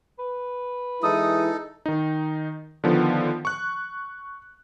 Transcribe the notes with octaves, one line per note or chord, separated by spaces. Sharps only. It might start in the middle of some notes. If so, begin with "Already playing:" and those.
B4
E3 G#3 D#4 E4 A4 D#6
D#3 D#4
D3 D#3 F3 B3
C#6 F#6